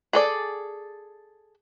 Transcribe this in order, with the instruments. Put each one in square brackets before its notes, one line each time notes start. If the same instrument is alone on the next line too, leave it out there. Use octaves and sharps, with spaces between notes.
[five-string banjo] G#4 A4 D5